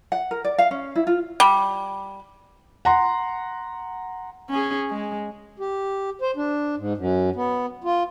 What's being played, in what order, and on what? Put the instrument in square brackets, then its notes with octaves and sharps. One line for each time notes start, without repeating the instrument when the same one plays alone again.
[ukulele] F#5
A#4
D5
F5
C#4
E4
F4
[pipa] G3
[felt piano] F#5 A#5 C6
[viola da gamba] C#4 G#4
G#3
[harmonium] G4
C5
D4
G#2
F#2
B3
F4